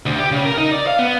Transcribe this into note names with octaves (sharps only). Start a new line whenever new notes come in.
D2
G4
C#3
A#4
D#4
D5
F5
B3